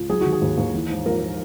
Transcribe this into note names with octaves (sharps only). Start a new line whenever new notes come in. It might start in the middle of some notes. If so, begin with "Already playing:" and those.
Already playing: C#2
F#3 G#4
D#3 F#4
G#4
D#2
D#2
E3
G#2
A#1 A#4